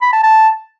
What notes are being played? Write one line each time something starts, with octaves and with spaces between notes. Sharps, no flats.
B5
A5
A5